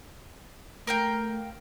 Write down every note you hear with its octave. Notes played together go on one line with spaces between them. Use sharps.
A3 A#4 F5 G5